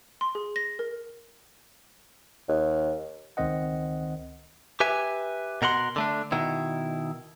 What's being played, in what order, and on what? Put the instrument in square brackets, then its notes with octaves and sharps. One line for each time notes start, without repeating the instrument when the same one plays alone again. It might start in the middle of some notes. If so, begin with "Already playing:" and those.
[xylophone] C6
G#4
A#6
A#4
[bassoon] D#2
[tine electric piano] C#2 D#3 C4 C5 D#5 F#5
[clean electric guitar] G4 B4 E5 G#5
B2 A#4 F#5 C6
D3 A3 D4
B2 D#3 E4